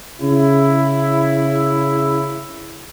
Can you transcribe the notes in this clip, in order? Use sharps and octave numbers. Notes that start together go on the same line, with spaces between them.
C#3 E4